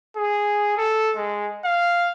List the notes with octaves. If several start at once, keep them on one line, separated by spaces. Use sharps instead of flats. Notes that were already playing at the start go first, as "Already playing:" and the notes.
G#4
A4
G#3
F5